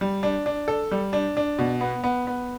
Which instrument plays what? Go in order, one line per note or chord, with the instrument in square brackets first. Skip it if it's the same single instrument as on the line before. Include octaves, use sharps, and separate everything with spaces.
[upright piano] G3
D4
D4
A4
G3
D4
D4
B2
B3
B3
B3